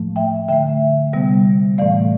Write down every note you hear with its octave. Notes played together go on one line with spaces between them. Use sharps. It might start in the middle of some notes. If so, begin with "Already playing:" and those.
Already playing: A2 F3 A3
E5 G5
D3 A3 E5 G5
C3 G3 B3
A2 E3 A3 D5 F5